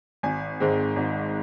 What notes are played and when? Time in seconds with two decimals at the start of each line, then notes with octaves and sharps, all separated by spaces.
0.23 G#1 G#5
0.60 G#2 D#3 G#3 C4
0.96 G#1